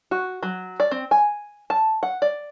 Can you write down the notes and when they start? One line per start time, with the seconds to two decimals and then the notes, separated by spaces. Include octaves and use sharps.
0.11 F#4
0.43 F#3
0.80 D5
0.91 C4
1.11 G#5
1.70 A5
2.03 F#5
2.22 D5